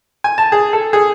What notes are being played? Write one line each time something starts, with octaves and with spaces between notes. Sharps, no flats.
G#5
A5
G#4
A4
G#4